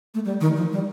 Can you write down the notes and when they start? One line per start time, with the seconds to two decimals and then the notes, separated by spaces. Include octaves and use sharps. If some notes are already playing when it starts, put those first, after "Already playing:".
0.14 A3
0.25 G3
0.41 D#3
0.56 F3
0.72 G3